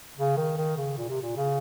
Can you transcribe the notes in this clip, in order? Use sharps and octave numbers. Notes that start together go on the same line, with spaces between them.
C#3
D#3
D#3
C#3
A#2
C3
A#2
C#3